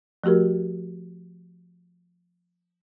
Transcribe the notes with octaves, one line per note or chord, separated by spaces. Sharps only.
F3 A3 F#4 G4 A#4